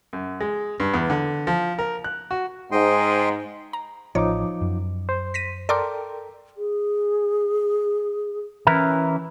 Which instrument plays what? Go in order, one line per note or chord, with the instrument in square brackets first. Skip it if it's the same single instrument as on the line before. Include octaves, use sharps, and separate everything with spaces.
[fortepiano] F#2
G#3
G2
E2
D3
F3
A#4
F#6
F#4
[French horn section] G#2 [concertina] D#5 G5 C6
[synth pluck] A#5
[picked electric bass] A1 [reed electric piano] F3 D#4 D6 [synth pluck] C#5
[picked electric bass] F#2
[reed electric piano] C5
[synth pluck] A#6 B6 D#7
[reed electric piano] A4 A#4 G5 [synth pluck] D5 C6 D6
[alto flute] G#4
[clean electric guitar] E3 E4 A#4 [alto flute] C#4